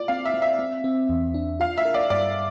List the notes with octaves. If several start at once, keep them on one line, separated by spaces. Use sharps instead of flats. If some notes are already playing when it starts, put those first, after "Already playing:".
Already playing: F4 D5
C4 F5
E5
C4
E5
C4
C4
E2
D4
F4 F5
E5
A#4
D5
G2 D5